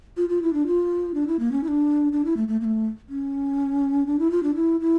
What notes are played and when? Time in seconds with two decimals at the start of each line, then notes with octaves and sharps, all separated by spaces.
0.17 F4
0.29 F4
0.42 E4
0.53 D4
0.67 F4
1.14 D4
1.27 E4
1.39 A#3
1.52 C#4
1.64 E4
1.68 D4
2.12 D4
2.25 E4
2.37 A3
2.48 A3
2.61 A#3
2.65 A3
3.09 C#4
4.06 D4
4.19 E4
4.31 F4
4.43 D4
4.55 E4
4.81 E4